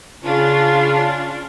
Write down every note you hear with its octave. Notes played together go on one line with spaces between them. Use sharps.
C#3 C#4 D4 F4